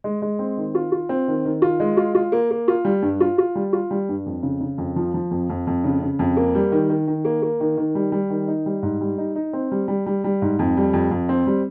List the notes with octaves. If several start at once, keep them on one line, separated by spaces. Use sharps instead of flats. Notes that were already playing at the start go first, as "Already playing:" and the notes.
G#3
G#3
C4
D#3
F4
F4
C4
D#3
D#3
F4
G#3
F4
F4
A#3
A#3
F4
G3
G2
F4
F4
G3
F4
G3
G2
F2
C#3
C#3
F2
F3
F3
F2
F2
F2
C#3
C#3
F2
A#3
G3
D#3
D#3
D#3
A#3
A#3
D#3
D#3
G3
G3
D#3
D#4
G3
G#2
G3
D#4
D#4
C4
G3
G3
G3
G3
G#2
F2
G3
F2
F2
C4
G3